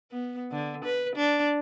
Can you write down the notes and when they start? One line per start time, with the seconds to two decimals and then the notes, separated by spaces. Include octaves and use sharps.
0.12 B3
0.51 D3
0.85 B4
1.16 D4